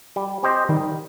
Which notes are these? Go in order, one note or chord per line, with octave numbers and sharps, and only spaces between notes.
G3
C4 G4 C5 D#5
D#3 G3